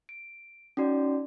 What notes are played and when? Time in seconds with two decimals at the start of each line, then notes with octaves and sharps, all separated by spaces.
0.09 D7
0.77 C#4 D#4 F#4 D5